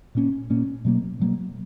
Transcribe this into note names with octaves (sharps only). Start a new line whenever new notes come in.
A#2 A#3 C#4
A#2 A#3 C#4
B2 F#3 A#3
B2 F#3 A#3